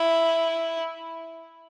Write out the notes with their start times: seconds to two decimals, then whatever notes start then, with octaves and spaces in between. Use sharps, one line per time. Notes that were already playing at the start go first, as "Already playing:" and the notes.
Already playing: E4